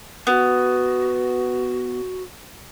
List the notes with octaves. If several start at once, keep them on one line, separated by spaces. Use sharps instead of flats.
B3 F#4